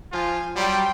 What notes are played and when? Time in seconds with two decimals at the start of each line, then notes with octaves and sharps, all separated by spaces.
0.12 F3 F4 G#5
0.56 F#3 G3 G5 C6